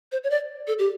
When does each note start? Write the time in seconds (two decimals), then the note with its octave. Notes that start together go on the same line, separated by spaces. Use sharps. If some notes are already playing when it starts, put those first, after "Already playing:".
0.12 C5
0.24 C#5
0.30 D5
0.67 A4
0.79 G4